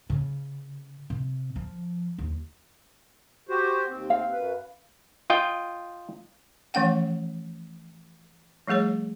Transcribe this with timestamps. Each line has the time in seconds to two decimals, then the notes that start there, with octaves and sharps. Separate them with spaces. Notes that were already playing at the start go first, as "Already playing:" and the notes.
0.10 C#3
1.10 C3
1.56 F3
2.18 D#2
3.49 F#4 G4 C5
3.89 D#2 C4
4.10 F5
4.32 F#2 B4
5.30 F4 D#5 G5
6.74 E3 F3 A3 C#4 F#5 G5
8.67 F3 G3 A3 G#4 C#5